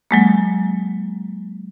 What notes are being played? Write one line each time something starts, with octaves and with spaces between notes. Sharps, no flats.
F#3 G#3 A#3